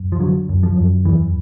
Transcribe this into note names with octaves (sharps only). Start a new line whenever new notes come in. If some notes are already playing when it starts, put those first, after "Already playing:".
Already playing: F#2
F3
D3 F#3
F#2
F3
F#2
E2 E3